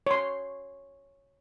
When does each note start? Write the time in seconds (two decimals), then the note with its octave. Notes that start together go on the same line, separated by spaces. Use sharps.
0.07 C#5 C6